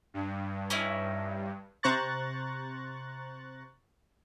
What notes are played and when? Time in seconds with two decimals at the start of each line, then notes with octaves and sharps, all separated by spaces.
0.14 G2
0.70 C#4 D#4 E4
1.83 C3 C5 A#5 C#6 F#6 A6